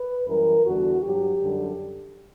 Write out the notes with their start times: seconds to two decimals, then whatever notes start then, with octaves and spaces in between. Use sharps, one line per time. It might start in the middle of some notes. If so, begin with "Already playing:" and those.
Already playing: B4
0.27 F#2 E3 G3 A#4
0.65 E2 D3 G3 F#4
1.03 G2 F#3 G4
1.41 F#2 D3 G3